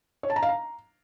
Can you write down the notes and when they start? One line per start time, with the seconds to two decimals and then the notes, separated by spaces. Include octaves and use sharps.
0.23 C#5
0.30 A5
0.36 A#5
0.43 F5
0.49 A#5